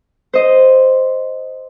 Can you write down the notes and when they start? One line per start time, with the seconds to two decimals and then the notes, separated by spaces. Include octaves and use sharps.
0.33 C5 D#5